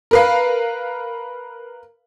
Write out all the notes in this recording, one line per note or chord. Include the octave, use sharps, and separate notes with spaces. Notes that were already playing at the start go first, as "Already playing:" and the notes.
A#4 B4 F5